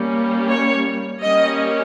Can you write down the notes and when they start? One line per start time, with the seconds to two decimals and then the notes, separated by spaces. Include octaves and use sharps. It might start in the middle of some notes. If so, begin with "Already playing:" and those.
Already playing: G3 A#3 C#4
0.48 C#5
1.22 G3 A#3 C#4 D#5